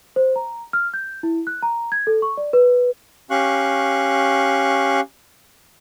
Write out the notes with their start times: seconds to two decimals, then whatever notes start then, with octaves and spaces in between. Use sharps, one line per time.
0.16 C5
0.36 A#5
0.73 F6
0.94 G6
1.23 E4
1.47 F#6
1.63 A#5
1.92 G#6
2.07 A4
2.22 C#6
2.37 D5
2.53 B4
3.30 C#4 G4 F5 C#6 F#6